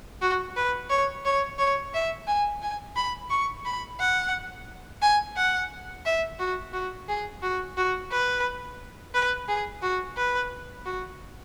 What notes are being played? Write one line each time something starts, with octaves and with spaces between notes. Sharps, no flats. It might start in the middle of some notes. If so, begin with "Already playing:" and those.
F#4
B4
C#5
C#5
C#5
E5
G#5
G#5
B5
C#6
B5
F#5
G#5
F#5
E5
F#4
F#4
G#4
F#4
F#4
B4
B4
G#4
F#4
B4
F#4